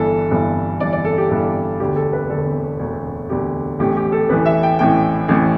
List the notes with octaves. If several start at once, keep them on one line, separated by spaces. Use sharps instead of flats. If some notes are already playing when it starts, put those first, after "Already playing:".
Already playing: G1 G2 E3 A4
G1 G2 E3
G1 G2 E3 D5
D5
A4
G4
G1 G2 E3 A4
E1 D2 D3 G4
A4
B4
E1 D2 D3 A4
E1 D2 D3
E1 D2 D3 G4
A1 A2 E3 G4
G4
A4
A1 A2 E3 B4
E5
G5
A1 A2 E3 G5
A1 A2 E3